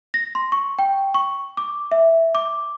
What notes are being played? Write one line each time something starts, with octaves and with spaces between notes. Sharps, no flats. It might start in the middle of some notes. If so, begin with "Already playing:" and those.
A#6
C6
C#6
G5
C#6
D6
E5
D6